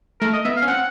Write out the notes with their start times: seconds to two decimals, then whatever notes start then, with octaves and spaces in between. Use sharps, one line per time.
0.21 A3 A#4
0.33 D#5
0.45 B3 E5
0.56 F5
0.62 C#4
0.68 C4 F#5